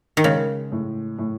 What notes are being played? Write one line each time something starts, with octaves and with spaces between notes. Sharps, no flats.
D#3
C#3 G#3
A2
A2